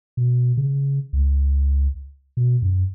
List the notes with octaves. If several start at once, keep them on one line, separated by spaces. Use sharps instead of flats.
B2
C#3
C#2
B2
F#2